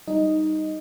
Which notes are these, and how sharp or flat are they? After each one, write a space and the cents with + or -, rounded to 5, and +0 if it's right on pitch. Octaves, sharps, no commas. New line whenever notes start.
G3 +0 D#4 +0 D#5 +0